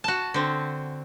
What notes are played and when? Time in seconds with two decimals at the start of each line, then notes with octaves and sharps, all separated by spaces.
0.04 F#4 A5
0.34 D3 C4